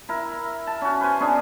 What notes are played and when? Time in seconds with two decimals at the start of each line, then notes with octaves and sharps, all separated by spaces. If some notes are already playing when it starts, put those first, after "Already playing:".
0.09 E4 A#4
0.67 A5
0.81 C#4 F#4
1.01 B4 C5 G#5
1.20 B3 C#4 D4 G#4